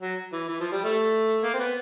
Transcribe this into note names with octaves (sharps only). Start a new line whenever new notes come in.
F#3
E3
E3
F3
G3
A3
A#3
C4
B3